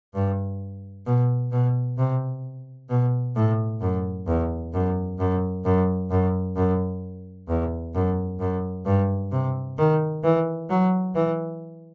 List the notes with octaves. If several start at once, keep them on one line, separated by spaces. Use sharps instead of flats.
G2
B2
B2
C3
B2
A2
F#2
E2
F#2
F#2
F#2
F#2
F#2
E2
F#2
F#2
G2
C3
D#3
E3
F#3
E3